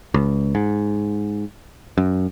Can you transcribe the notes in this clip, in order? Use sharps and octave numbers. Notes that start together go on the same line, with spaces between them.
C#2
G#2
F#2